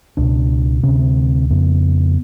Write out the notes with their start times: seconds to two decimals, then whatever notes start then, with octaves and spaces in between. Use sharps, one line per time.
0.17 C#2 B2 D4
0.83 D2 C3 C#4
1.00 C4
1.50 F2 C#3 B3